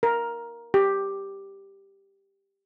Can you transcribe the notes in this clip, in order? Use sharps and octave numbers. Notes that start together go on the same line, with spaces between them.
A#4
G4